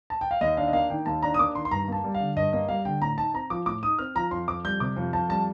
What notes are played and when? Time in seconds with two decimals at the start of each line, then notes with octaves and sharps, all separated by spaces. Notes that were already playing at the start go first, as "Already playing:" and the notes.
0.10 A5
0.21 G5
0.31 F5
0.41 D#2 D#5
0.57 D4 F5
0.68 D#5
0.73 A#3 F5
0.90 D#3 G5
1.06 D#2 A5
1.22 D4 A#5
1.34 D#6
1.39 A#3 D6
1.55 D#3 C6
1.65 C6
1.71 G2 A#5
1.88 A#3 A5
2.04 G3
2.14 F5
2.20 D3
2.36 G2 D#5
2.53 A#3 D#5
2.68 G3 F5
2.85 D3 G5
3.01 A2 A#5
3.18 D#4 A5
3.34 C4 A#5
3.50 F3 D6
3.66 A2 D6
3.83 D#4 D#6
3.99 C4 F6
4.15 F3 A#5
4.31 F2 C6
4.48 F2 D6
4.65 G3 G6
4.80 C3 D6
4.96 F2
5.13 F2 A5
5.29 G3 A5